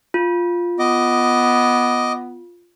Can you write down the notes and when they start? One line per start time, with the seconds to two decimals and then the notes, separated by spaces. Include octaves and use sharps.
0.14 F4
0.79 B3 D#5 D6